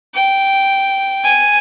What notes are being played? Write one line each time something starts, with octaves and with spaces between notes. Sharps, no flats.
G5
G#5